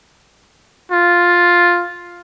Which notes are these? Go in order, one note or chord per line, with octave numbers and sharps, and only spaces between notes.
F4